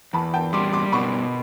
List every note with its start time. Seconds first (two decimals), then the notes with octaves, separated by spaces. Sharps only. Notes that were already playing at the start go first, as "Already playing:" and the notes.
0.13 E2 A5 B5
0.33 G5 A5
0.53 G3 C6 D6
0.73 C6 D6
0.92 B2 B5 C#6